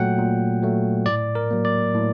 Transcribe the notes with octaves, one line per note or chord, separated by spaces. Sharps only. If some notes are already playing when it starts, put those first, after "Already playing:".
Already playing: A#2 F#3 A3 F#5 G5
A#2
F#3 A3
A2 D5
A#4
F#3 A#3
D5
A2